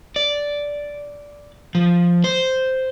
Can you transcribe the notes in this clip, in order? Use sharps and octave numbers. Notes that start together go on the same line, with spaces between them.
D5
F3
C5